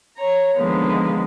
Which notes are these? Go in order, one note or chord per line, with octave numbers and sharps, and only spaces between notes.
C#5 A#5
D3 D#3 F3 G#3 A#3 B3